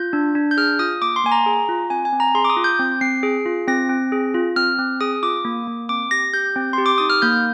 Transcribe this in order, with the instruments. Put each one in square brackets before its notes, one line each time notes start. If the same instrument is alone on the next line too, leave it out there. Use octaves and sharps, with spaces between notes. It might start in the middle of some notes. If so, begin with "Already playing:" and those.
Already playing: [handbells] F4 G6
D4
D4
G6
G#4 F6
F4 D#6
A#3 D6
C6
A#3 G#5
A#5
G#4
F4
C4 G#5
G#5
C4
A#5
G#4 C6
D6
D#6
F4
G6
C4
C4 C7
G#4
F4
C4 A#6
C4
G#4
F4
C4 F6
C4
G#4 D#6
F4 D6
A#3
A#3
C4 D6
G4 A#6
G4 G6
C4
G4 C6
D6
D#4 D#6
F6
A#3 G6